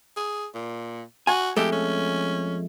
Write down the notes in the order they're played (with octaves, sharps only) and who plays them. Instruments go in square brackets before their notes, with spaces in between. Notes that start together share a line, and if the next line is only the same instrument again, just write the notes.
[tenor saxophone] G#4
A#2
[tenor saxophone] F#4 [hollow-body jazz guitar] G#5
[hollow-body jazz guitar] F2 G#3 A3 [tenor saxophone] G4
[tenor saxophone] C#4